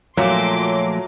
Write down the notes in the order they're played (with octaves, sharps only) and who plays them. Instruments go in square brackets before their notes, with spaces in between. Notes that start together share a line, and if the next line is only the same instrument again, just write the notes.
[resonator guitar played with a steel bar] A#2 [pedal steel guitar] F3 A3 E5 [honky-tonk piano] F#3 [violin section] C6 D6